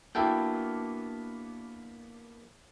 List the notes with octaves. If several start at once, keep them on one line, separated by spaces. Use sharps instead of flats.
A#3 B3 D4 E4 F#4 A4 G5